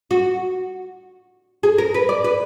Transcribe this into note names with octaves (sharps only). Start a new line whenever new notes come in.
F#4
G#4
A#4
B4
D5
B4